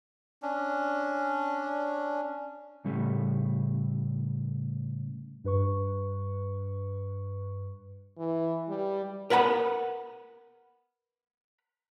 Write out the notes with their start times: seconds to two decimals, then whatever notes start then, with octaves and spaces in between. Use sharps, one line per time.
0.43 C#4 D4
2.85 A2 C#3 G3 A3
5.44 G2 B4 C#6
8.18 E3
8.69 G3
9.30 A#4 B4 F#5 A5 B5